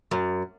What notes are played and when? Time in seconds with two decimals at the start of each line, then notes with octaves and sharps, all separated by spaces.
0.11 F#2